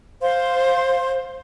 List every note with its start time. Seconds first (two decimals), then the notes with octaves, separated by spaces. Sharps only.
0.21 C5 F5 C6